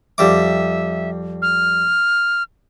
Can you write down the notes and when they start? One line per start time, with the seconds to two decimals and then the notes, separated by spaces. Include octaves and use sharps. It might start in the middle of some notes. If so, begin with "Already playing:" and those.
0.18 F2 G3 E5 D6
1.42 F6